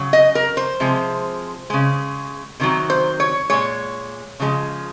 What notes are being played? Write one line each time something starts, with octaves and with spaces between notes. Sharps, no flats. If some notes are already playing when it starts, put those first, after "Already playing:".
Already playing: C#3 F#3
D#5
A#4
C5
C3 F3 G#3
C#3 G#3
C3 D#3 F#3
C5
C#5
A#2 G#3 C#5
C#3 F3 G#3